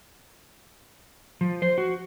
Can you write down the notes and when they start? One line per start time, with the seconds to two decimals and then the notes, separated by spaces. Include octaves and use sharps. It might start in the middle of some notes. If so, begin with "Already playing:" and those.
1.41 F3
1.62 C5
1.78 F#4